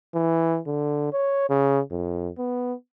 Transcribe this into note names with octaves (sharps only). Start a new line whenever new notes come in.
E3
D3
C#5
C#3
F2
B3